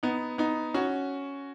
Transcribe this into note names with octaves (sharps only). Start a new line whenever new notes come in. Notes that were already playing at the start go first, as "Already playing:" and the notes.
B3 D#4
B3 D#4
C#4 F#4